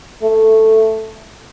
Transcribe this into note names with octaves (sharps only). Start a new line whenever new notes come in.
A3